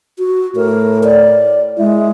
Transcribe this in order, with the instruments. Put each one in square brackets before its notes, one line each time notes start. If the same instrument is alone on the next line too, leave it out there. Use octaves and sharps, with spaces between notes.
[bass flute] F#4
[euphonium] A2 [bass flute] A#4
[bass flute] D5
[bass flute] G#3 [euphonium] E4